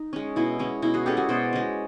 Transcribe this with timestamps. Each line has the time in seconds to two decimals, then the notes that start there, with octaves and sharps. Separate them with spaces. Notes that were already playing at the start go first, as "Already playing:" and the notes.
Already playing: D#4
0.13 G#3 C#4
0.36 B2 E4
0.59 G#3 C#4
0.82 B2 E4
0.94 F#4 G#4
1.06 G#3 C#4 G4 A4
1.17 F#4 G#4
1.29 B2 C5 D5
1.53 G#3 C#4